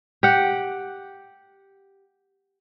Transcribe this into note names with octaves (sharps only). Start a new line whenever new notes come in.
G4 F#5